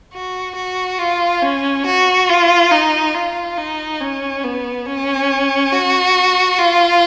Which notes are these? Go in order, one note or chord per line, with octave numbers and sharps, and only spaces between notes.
F#4
F#4
F4
C#4
F#4
F4
D#4
F4
D#4
C#4
B3
C#4
F#4
F4